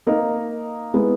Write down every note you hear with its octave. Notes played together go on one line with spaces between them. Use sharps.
A#3 D#4 A#4 D#5
G#3 B3 E4 G#4